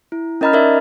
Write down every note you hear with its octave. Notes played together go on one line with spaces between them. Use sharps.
E4
C#4 A#4 D#5 A#5 B5 F6
D#4 A#4 D5 E5